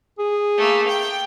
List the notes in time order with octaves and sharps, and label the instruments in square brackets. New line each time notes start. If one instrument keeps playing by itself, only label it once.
[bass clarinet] G#4
[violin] A3 A#3
G5